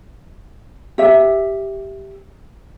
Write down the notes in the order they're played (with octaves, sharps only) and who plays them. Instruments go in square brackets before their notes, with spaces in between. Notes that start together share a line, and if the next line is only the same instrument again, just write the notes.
[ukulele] G4 E5